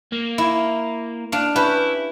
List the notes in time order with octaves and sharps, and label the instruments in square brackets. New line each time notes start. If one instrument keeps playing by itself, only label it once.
[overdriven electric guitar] A#3
[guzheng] E4
D4 F5
[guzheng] C#4 G4 B4 [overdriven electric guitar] E4